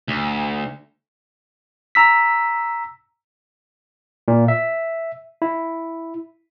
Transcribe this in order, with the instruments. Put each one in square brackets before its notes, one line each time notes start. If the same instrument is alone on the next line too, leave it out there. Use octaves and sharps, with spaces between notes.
[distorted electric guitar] D2
[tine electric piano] A#5 E6 B6
A#2
E5
E4